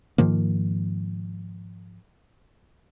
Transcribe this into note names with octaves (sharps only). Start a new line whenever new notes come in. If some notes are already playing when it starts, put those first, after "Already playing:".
G#2 D#3 F3 A#3